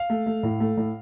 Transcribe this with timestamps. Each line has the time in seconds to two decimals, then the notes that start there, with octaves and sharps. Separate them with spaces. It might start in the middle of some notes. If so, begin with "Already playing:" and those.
Already playing: F5
0.10 A3
0.26 A3
0.43 A2
0.60 A3
0.77 A2